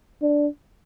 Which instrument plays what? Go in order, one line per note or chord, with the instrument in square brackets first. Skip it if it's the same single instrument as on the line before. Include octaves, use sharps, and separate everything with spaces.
[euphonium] D4